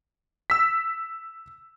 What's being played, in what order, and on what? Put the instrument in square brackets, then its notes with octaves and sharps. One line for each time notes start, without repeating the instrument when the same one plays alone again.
[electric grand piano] E6 B6